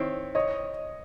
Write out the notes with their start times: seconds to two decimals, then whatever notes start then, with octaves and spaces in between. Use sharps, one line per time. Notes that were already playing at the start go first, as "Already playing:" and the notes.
Already playing: D#3 C4 E4 C#5
0.35 C#5 D#5